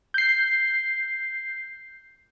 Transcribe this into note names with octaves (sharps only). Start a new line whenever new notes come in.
G6 C7